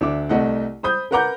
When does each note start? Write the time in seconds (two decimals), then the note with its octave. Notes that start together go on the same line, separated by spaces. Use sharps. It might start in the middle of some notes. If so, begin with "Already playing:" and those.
0.01 D2 D4 E5 D6
0.29 C2 A3 D#5 F#5
0.83 C5 B5 D#6 G6
1.11 A#4 B4 F#5 A#5 D6 G6